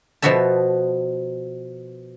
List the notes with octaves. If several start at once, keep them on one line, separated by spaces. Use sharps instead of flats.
B2 F3 B3 F#4 E5 A5